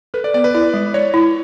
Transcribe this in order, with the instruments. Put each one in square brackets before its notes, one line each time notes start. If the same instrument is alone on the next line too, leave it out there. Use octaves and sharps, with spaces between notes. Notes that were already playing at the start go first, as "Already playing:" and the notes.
[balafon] A4 [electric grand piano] B4
[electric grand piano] D5
[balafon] B3 [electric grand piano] D5
[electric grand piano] B4
[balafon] E4 [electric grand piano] D5
[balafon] G#3
[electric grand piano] C#5 [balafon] D5
[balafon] E4